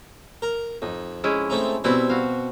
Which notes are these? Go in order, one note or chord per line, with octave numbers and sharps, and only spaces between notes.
A#4
F2 D#4
G#3 C#4 E4
A3 C4 D#4
B2 G3 C4 E4 B4
F#4 F5